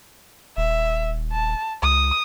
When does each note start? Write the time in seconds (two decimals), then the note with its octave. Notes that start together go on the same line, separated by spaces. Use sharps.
0.57 D#1 E5
1.33 A5
1.82 C#2 D#6